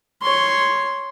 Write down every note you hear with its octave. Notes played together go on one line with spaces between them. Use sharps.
C#5 C6